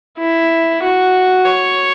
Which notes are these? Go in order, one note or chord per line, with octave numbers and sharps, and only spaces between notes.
E4
F#4
C#5